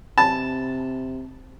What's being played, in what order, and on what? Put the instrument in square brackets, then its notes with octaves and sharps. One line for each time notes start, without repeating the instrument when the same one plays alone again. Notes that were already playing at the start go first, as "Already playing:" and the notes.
[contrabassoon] C3 [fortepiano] A5